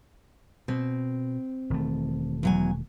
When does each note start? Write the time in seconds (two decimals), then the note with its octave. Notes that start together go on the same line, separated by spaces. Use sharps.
0.68 B2 C4
1.70 E1 D#3 A3
2.43 E2 F#3 G#5